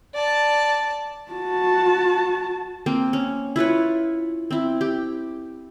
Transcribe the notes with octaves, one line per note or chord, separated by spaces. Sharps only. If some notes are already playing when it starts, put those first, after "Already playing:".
D5 A5
F#4 A5
A#3 C4
C#4
E4 F4 B4 C#5
C4 E4
G4